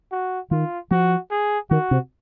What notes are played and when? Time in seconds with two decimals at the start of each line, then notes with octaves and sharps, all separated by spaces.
0.12 F#4
0.51 D#3 F4
0.91 F3 F#4
1.31 G#4
1.70 D#3 F#4
1.91 C3